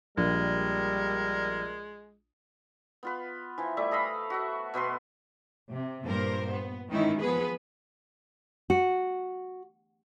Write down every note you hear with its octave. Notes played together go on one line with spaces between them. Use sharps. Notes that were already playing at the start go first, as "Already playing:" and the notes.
A#1 G3 G#3 A#4
B3 F4 B4
E3 F3
G3 A3 E5
A4 D#5 F5 B5
F#4 E5
B2 B3 B4 C6
C3
G2 A#2 A#4 C5
B3
D#3 E3 G#3 C#4 D#4 E4
F3 B3 G#4 B4
F#4